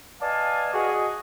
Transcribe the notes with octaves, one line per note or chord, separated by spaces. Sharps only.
B4 D5 D#5 F5 G#5 A5
F#4 G#4 D#5